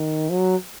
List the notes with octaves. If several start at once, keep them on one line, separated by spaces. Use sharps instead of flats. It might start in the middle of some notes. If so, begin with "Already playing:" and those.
Already playing: D#3
F#3